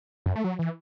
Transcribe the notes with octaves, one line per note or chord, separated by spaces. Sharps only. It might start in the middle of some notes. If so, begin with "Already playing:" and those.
F#2
A3
F#3
E3